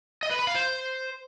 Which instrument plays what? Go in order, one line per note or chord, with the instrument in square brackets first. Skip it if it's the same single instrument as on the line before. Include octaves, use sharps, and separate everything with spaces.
[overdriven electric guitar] D#5
B4
B5
F5
C5